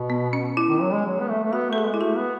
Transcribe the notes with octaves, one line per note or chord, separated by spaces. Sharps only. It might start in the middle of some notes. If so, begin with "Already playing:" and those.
Already playing: B2
B3
C#4
E4
D#3
F#3
G#3
F#3
B3
A3
A3
B3 F#4
A3 A4
G#4
G#3
E4
A3 F#4
B3